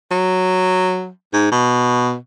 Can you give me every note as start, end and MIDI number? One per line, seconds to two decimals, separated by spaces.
0.11 1.09 54
1.33 1.48 44
1.52 2.15 47